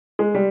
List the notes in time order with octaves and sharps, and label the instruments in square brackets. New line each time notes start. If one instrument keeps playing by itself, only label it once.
[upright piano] G#3
G3